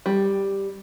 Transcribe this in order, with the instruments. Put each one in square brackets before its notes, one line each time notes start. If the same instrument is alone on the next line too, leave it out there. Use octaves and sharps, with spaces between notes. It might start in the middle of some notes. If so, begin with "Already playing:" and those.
[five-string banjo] G3